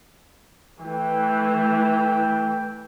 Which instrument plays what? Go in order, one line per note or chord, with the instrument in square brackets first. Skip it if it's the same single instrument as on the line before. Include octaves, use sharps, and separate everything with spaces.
[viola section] E3 A3 [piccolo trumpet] G5